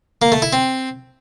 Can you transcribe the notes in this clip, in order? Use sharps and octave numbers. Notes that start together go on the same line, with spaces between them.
A#3
A3
E4
C4